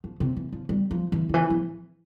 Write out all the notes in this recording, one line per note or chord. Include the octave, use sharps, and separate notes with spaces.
F3
C3
E3
F3
G3
F3
E3
D3
E3
F3